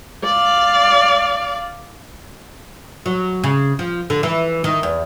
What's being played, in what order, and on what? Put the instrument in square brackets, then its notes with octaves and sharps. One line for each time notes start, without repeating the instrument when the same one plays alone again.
[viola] D5 F5
[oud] F#3
C#3
F3
D3
E3
D#3
E2